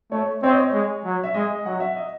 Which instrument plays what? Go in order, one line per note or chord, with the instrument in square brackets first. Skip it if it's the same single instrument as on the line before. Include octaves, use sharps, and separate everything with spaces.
[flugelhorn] A3 [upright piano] C#5
[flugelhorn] C4 [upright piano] C#5
[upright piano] D#5
C#5
[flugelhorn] G#3
F#3
[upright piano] E5
[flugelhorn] G#3 [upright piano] D#5
[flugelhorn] F#3 [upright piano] F#5
[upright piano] E5
D#5